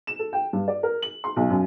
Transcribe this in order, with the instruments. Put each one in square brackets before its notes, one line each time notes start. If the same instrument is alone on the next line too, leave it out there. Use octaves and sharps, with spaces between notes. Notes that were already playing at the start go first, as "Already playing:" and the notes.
[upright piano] E7
A4
G5
G2
D5
A#4
F#7
C6
B1
F#2